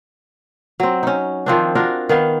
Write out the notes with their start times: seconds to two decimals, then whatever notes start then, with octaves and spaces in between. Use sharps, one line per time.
0.80 F#3 C4
1.03 C#4 D#4
1.46 D#3 F3 C4 D4
1.75 D4 F4 F#4 A#4
2.09 D#3 B3 F5